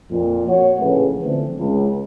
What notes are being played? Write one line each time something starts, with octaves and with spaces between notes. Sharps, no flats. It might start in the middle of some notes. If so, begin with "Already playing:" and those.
F2 A#2
F#4 C#5 F#5
A#1 A2 C#3 E3 A4 B4
D3 E3 F3 A3 C4 D4
C#2